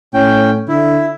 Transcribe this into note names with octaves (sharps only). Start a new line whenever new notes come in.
A2 C#4 G5
D3 E4